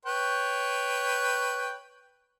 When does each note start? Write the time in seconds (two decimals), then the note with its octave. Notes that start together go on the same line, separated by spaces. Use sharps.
0.06 B4 C#5 G5